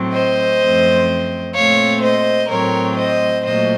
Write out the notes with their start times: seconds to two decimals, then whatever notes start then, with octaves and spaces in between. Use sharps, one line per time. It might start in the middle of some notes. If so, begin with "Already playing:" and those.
Already playing: A2 F#3 A3 C4
0.12 C5 D#5
0.60 F#2 F3 A3 C4
1.54 A#2 A3 C4 C#5 F5
2.02 C5 D#5
2.49 A2 F#3 A3 C4 A#4 C#5
2.96 C5 D#5
3.44 A#2 F#3 A3 C5 D#5